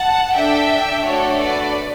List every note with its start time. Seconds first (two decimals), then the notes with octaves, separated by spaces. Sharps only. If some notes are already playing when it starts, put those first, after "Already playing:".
Already playing: F#5 A5
0.34 D4 A4 E5 G5
1.04 A3 D4 F#4 A4 C#5
1.39 B4 D5